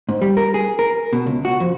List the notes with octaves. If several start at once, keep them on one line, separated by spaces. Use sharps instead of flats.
G#2
G3
A#4
G#4
A#4
B2
C#2
F#4
F2